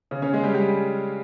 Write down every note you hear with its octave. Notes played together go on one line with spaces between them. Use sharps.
C#3 C#4
C#3 C#4
G#3 G#4
G3 G4
G3 G4